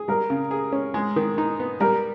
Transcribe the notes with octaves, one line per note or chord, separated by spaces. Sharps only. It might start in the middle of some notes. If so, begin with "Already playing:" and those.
Already playing: G#4
G3 A#4
C#3
G#4
C#4
G#3
D#3
D#4
B3
G3 A#4